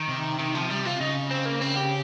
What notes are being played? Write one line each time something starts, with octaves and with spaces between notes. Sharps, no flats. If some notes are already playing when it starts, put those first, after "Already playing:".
Already playing: D#3
C3
D#3
F3
G3
F4
C#3 D#4
C4
A#3
C4
G4